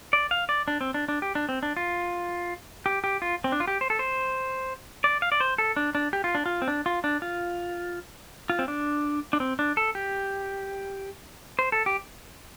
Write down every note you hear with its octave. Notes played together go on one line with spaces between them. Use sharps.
D5
F5
D5
D4
C4
D4
D4
G4
D4
C4
D4
F4
G4
G4
F4
C4
D4
F4
G4
C5
A4
C5
D5
F5
D5
C5
A4
D4
D4
G4
F4
D4
F4
C4
D4
F4
D4
F4
F4
C4
D4
D4
C4
D4
A4
G4
C5
A4
G4